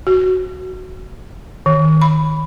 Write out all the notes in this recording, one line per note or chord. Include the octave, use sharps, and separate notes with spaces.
F#4
D#3
B5